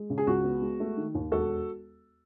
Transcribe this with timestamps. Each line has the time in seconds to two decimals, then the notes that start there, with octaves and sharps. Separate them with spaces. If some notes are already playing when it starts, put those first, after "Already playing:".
Already playing: G#3
0.10 C#3
0.18 G#4
0.27 C#2 F#4
0.44 B3
0.62 G#3
0.80 A3
0.97 D#3
1.15 D#2
1.32 E1 F#4 A4